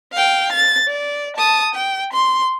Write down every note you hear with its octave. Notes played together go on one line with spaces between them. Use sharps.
F5 G5
A6
D5
A5 D#6
G5
C6